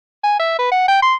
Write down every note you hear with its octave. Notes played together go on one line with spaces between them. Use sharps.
G#5
E5
B4
F#5
G5
C6